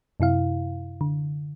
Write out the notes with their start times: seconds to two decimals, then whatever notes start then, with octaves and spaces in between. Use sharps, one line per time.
0.20 F#2 C3 E4 F5
1.01 D3